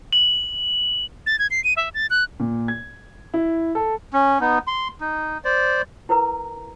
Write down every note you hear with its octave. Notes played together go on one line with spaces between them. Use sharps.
F#7
A6
G#6
C7
D#7
E5
A6
F#6
A#2
G#6
E4
A4
C#4
B3 D#4
C6
D#4
C5 D5
E4 A#4 B4 A#5